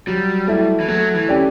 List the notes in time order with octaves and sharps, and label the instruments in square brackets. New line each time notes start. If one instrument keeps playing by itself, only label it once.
[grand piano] F#3 [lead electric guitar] G3
[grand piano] A3 E4
[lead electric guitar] E3
[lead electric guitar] F#3 [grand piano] A3
[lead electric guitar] E3
[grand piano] C#4 G4 D5